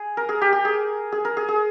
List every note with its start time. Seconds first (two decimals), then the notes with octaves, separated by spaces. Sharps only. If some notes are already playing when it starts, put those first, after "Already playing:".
Already playing: G#4
0.17 A#4
0.29 G#4
0.41 G4
0.53 G4
0.65 G#4
1.12 G#4
1.25 A#4
1.37 G#4
1.48 G#4